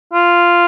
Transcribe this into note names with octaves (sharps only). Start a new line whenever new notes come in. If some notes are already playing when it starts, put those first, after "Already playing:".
F4